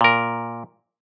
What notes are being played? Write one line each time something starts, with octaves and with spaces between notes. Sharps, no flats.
A#2 A#4